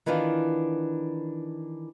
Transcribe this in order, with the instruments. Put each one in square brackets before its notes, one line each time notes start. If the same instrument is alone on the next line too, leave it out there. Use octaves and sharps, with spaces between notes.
[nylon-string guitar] D#3 E3 B3 D4 F4